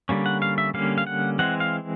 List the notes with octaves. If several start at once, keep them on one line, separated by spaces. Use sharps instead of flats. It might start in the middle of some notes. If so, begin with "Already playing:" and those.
D3 G3 A#3 C#4
F#5
F5
E5
D3 G3 A#3 C#4 F5
F5
F#5
E3 G#3 C4 F#5
F5